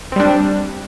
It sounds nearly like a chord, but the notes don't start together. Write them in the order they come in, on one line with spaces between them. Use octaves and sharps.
C4 G3 D4